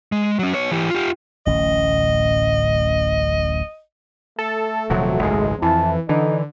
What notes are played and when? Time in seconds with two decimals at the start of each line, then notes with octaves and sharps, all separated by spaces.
0.12 G#3
0.39 F#3 C#4
0.53 B3 C#5
0.72 E3 G4
0.90 F4 G4
1.47 D1 A1 C#4 D#5
4.39 A3 A4
4.90 D#1 C3 F3 F#3
5.23 G#1 C#2 F#2 G#3
5.62 F2 E3 A5
6.09 D3 E3 D#4